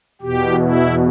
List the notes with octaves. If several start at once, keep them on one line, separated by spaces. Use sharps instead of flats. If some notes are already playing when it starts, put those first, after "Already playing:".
E2 B2 G4
E4